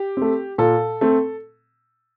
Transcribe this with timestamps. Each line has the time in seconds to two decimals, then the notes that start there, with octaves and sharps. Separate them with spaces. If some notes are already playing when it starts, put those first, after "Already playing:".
Already playing: G4
0.17 A3 C4
0.58 A#2 A4
1.01 A3 C4